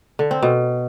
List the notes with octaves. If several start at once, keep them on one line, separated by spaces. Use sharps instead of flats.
D3
C4
B2